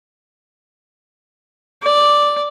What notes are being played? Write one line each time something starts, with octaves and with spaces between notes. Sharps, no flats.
D5